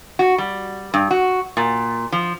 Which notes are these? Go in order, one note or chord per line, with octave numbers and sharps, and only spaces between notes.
F#4
G3
G2
F#4
A#2
F3